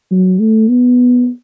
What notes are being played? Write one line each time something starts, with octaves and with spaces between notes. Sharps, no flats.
F#3
A3
B3